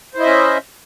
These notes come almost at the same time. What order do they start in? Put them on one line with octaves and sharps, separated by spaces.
C5 E4 D#5 E5 C#4